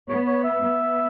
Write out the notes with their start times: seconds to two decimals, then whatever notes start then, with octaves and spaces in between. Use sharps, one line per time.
0.09 B3 C#5
0.27 C#5
0.44 E5
0.62 B3